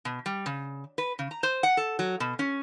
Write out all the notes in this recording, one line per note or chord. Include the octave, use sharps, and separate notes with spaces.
B2
G3
C#3
B4
C#3
A#5
C5
F#5
A4
F#3
B2
C#4